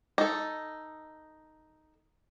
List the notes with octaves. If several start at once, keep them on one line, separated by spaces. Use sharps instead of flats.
D#4 A4